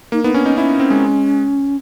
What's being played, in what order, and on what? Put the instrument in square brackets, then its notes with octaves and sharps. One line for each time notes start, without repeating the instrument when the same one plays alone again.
[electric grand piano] A#3 [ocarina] D#4
[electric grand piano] B3 [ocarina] D#4
[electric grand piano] C#4 [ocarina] D4
[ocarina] C#4 [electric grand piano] D#4
[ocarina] C#4 [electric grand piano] E4
[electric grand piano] C4
G#3